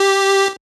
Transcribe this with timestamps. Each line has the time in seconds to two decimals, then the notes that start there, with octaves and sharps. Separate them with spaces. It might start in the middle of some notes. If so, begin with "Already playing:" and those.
Already playing: G4